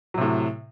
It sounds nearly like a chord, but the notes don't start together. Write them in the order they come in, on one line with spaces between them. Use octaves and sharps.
F#3 C3 A2